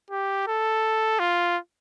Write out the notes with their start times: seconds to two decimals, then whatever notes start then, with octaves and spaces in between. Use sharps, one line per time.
0.11 G4
0.47 A4
1.20 F4